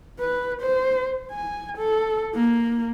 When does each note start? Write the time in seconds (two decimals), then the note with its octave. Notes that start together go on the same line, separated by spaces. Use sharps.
0.19 B4
0.61 C5
1.31 G#5
1.77 A4
2.34 A#3